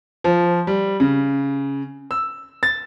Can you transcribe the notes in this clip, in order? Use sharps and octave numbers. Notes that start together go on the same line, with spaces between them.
F3
G3
C#3
E6
A6